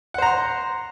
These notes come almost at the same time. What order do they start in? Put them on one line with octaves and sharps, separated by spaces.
F#5 C5 A#5 C6